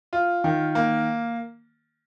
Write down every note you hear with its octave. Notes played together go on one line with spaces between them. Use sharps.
F4
D#3
A#3